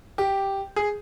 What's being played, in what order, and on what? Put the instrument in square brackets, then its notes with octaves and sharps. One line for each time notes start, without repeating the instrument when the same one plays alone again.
[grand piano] G4
G#4